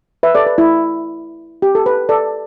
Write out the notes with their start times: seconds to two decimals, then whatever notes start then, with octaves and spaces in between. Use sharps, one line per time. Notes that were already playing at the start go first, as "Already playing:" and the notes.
0.23 B4 E5
0.35 A4 D5
0.47 B4
0.58 E4
1.62 G4
1.75 A4
1.86 B4
2.09 A4 D5